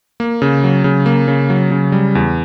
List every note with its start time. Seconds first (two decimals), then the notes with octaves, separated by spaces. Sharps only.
0.20 A#3
0.42 C#3
0.64 F#3
0.84 C#3
1.06 A#3
1.28 C#3
1.50 F#3
1.71 C#3
1.92 G3
2.15 E2